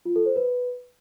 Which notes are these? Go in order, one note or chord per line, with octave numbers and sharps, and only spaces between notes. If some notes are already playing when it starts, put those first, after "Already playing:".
F4
A4
C5
B4